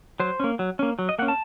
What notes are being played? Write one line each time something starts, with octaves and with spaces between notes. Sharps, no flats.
F#3 C5
A#3 C#4
F#3
A#3 C#4
F#3
D#5
A#3 C#4 F#5
A5